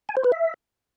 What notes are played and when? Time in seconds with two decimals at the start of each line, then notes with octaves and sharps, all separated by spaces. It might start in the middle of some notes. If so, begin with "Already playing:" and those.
0.09 G#5
0.17 C5
0.24 B4
0.32 E5